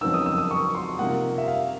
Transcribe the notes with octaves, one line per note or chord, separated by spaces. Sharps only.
F2 C#3 F#3 B3 D#4 E6
D#6
E6
D#6
C#6
C6
C3 F3 A#3 D#4 F#5
E5
F5